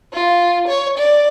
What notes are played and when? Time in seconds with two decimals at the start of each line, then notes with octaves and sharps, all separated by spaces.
0.13 F4
0.68 C#5
0.98 D5